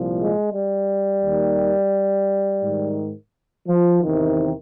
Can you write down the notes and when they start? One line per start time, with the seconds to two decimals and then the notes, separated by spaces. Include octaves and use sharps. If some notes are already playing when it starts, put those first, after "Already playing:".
Already playing: C2 A#2 F3
0.18 G#3
0.53 G3
1.23 D#2 D#3
2.63 G#2 D#3
3.68 F3
4.03 E2 C3 D#3